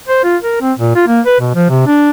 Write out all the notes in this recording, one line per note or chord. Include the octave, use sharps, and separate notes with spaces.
C5
F4
A#4
C4
A#2
F4
A#3
B4
B2
F3
C3
D4